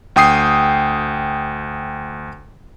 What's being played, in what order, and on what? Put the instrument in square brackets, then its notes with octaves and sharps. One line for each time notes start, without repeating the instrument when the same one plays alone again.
[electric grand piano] D2 G5 D#6 C7